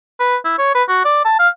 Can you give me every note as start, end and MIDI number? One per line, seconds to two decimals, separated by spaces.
0.20 0.36 71
0.45 0.55 64
0.59 0.73 73
0.75 0.83 71
0.88 1.01 66
1.05 1.23 74
1.25 1.38 81
1.39 1.49 77